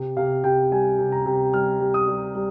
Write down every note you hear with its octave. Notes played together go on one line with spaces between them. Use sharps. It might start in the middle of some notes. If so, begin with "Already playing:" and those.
Already playing: C3
C3 F5
C3 G5
G3 G#5
C3
A#5
C3
G3 F6
G3
D#6
G3
G3